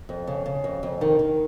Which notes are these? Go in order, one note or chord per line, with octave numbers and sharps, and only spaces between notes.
F2
C#3
C#3
F2
F2
D#3
D#3